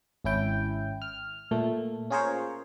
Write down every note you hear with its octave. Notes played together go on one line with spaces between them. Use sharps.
G#1 C#4 E4 G5
F6
A#2 A3
C#4 F4 G#4 A#4 C5 C#5